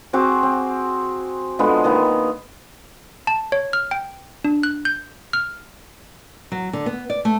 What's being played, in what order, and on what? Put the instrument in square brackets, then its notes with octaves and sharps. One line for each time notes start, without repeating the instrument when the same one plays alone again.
[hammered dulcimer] C4 F#4 G#4 D6
C4
D3 F3 G#3 B3
D#3 A#3 B3
[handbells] A5
C#5
F6
G5
D4
F#6
G6
F6
[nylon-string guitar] F#3
D3
B3
D5
A3